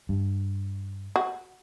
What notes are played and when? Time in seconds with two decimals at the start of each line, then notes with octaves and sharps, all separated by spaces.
0.09 G2
1.16 F#4